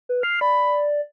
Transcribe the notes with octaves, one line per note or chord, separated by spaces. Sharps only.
B4
F6 C7
D5 B5